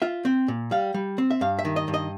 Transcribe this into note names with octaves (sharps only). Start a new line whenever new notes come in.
F4 E5
C4
A#2
G3 F5
G3
C4
E5
G2 F5
E5
D#3
D#5
G2
D#5